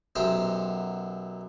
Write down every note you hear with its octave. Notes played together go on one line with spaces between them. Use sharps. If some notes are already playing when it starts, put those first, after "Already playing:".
B1 F#2 G4 C5 E5